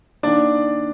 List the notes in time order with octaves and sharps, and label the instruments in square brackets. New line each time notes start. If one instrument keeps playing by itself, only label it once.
[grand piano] D#3 A#3 D4 D5